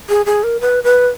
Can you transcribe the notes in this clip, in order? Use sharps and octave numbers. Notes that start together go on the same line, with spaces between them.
G#4
G#4
A#4
B4
B4